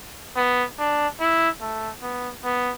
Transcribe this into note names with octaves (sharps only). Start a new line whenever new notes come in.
B3
D4
E4
A3
B3
B3